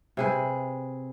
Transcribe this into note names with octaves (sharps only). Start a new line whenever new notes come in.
C3 G#4 B4